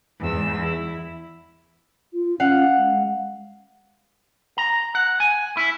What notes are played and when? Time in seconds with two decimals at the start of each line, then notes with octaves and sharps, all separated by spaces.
0.19 E2 G#2 E6
0.61 E4
2.13 F4
2.40 C#4 F5 F#5
2.78 G#3
4.58 A#5
4.95 F#5
5.20 G#5
5.57 E4